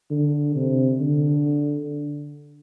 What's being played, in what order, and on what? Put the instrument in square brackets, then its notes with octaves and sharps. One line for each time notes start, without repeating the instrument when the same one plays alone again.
[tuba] D3
C3
D3